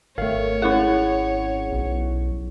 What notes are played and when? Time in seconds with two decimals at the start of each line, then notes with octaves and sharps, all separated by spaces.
0.18 G#1 A3 A#4 C#5 F5
0.62 C#4 E4 G#4 F#5 C#6
1.72 B1